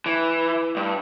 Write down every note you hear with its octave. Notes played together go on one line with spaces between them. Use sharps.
E3
G2